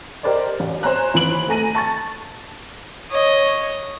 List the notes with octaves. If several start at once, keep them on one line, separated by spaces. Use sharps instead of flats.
G4 A#4 C5 D5 D#5
A1
C5 C#5 G#5 A#5 F#6
D#2 E3 C5 B5 D7 F#7
A3 G#5 A#5 A#6 D#7
A5 C#6 A6
C#5 D#5